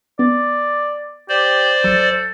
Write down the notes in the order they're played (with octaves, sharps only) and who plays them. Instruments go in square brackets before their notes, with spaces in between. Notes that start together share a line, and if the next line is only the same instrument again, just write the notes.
[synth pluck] B3 [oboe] D5
[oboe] G4 [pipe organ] C5 D5
[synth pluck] G#1 F#3 [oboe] A4